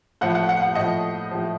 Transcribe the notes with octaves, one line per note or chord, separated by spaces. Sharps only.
A2 F3 F#5
F#5
F#5
F#5
A2 F3 D#5
A2 F3